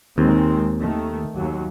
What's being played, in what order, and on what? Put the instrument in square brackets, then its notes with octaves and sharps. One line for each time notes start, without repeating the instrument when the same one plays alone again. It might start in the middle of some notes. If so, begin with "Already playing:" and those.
[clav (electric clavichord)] D#2 [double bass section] D#3 G#3 C4
[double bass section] D#3 A3
D#2 F#3